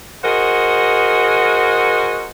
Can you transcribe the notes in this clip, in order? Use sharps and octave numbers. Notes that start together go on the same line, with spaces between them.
F#4 G#4 A#4 C5 D#5 F#5